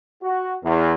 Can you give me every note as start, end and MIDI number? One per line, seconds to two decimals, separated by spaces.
0.23 0.53 66
0.63 0.93 40